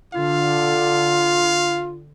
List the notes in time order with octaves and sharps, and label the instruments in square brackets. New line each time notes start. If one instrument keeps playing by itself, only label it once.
[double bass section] D3 [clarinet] F4 [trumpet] F5